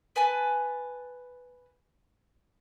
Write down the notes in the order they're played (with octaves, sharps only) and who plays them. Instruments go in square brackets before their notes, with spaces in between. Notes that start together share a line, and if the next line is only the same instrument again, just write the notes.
[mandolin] B4 G#5 A5